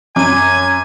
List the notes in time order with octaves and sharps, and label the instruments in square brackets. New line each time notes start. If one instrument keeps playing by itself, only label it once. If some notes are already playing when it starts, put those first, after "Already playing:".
[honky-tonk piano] F#2 [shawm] G#5 [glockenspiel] D6 D#7